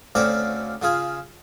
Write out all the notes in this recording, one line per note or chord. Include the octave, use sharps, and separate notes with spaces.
D2 C#3 C4 D5 F5 D6
C#3 F4 G#4